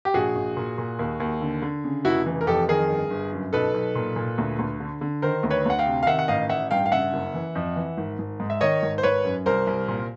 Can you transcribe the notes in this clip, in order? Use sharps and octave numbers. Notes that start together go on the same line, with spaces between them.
G4
A#1 F#4 G#4
A#1
A#2
A#2
D#2
D#2
D3
D3
C#3
F1 E4 F#4
E3
A#4
F2 G4 A4
D#3 G#4 A#4
G1
G1
F#2
B1 A4 B4
B1
A#2
A#2
D2
D2
D3
D3
D#3 A#4 C5
D2
B4 C#5
D2 F#5
F5 G5
C3
F5
D#3 E5 F#5
F#5
A1 D#5 F5
A1 E5 F#5
G2 F5 G5
F5
C#3 E5 F#5
F#1
E3
F2
E3
G#1
G#1
G#2
E5
D#3 C#5 D#5
G#1
C5
G#1 B4 C#5
F#2
C2 A#4 C5
C2
A#2